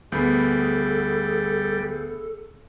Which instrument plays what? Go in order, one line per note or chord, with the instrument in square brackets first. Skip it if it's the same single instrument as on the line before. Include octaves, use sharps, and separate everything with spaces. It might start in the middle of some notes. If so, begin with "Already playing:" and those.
[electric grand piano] D2 B3 B5 [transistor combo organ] G3 [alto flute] G#4 [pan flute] A4